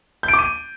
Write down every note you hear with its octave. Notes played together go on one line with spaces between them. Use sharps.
G6
D7
D6
D#7